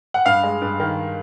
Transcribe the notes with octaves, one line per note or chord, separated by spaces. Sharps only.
F#5
G2 F5
G#3
G2
D#3